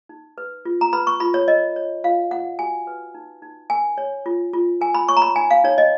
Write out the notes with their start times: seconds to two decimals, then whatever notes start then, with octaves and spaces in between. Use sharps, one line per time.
0.09 D#4
0.38 B4
0.65 F4
0.81 A#5
0.93 B4 B5
1.07 C#6
1.20 F4 B5
1.34 C#5
1.48 A#4 D#5
1.76 C#5
2.04 F4 F5
2.31 F4 F#5
2.59 F#4 G#5
2.87 B4
3.15 D#4
3.42 D#4
3.70 A#4 G#5
3.98 C#5
4.26 F4
4.53 F4
4.81 A#4 G#5
4.95 B5
5.08 C#5 C#6
5.17 A#5
5.22 B5
5.36 D#4 G#5
5.51 F5
5.64 D#4 C#5
5.78 D#5